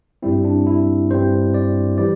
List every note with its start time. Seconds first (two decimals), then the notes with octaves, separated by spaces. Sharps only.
0.22 G2 G3 C4 E4
0.45 D4
0.67 E4
1.10 G2 G3 C4 C5
1.54 D5
1.98 E3 G3 D5